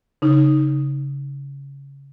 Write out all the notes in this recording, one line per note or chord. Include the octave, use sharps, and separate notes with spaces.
C#3 D#4